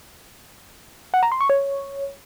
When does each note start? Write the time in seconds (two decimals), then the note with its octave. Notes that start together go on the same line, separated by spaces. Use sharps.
1.14 F#5
1.23 A#5
1.32 C6
1.41 C#6
1.50 C#5